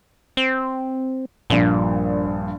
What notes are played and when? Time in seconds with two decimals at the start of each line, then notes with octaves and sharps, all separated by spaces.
0.37 C4
1.50 A#1 G2 A#2